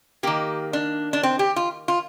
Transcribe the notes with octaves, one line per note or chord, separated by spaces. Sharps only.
D#3 A#3 G4
D4
D4
C4
G4
F4
F4